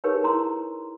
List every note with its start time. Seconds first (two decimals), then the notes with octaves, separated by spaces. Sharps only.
0.04 D#4 G4 G#4 A#4 B4 C#5
0.24 E4 A#5 C6